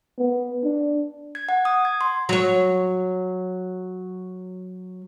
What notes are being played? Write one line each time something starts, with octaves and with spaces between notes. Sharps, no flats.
B3
D4
G#6
F#5
D#6
G#6
C6
F#3 C#5